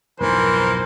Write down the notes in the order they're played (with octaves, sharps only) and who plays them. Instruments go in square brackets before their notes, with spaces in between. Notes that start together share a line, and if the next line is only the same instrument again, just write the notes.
[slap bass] B1 F2 G#2 [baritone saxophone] E3 [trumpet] A#4 [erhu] C5